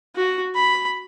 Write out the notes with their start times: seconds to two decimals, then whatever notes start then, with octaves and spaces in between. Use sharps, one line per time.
0.16 F#4
0.55 B5